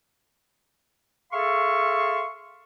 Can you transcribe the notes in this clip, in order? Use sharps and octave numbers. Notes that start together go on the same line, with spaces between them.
G#4 A4 E5 F5 C6 C#6